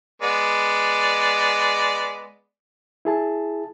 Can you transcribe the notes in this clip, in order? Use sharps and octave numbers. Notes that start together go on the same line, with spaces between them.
G#3 B3 D5
E4 G#4 A5